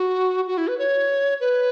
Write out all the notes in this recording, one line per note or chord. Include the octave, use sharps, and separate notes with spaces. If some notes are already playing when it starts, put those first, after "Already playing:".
Already playing: F#4
F#4
E4
B4
C#5
B4